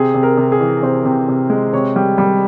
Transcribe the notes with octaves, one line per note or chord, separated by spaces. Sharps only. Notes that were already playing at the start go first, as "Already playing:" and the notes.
Already playing: C3 G#4
C3
A#4
C3
G#4
E3
C3 C5
C3
C3
G#3
C3 C#5
G3
G3